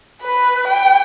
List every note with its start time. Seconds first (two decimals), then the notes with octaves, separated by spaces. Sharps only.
0.22 B4
0.68 G5